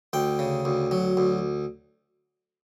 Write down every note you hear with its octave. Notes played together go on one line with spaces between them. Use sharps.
D2 G5
C#3
D2
F#3
D2